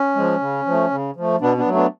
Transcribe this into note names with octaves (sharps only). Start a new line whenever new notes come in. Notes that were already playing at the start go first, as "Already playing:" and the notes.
Already playing: C#4
F3 G#3
C#3
F3 A3
C#3
F3 A3
B2 B3 D4
B3 D4
F#3 A3
B3 D4